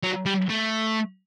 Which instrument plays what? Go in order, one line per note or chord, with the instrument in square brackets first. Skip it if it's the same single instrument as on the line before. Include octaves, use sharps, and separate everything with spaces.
[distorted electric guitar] F#3
G3
A3